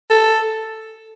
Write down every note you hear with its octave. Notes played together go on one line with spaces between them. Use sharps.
A4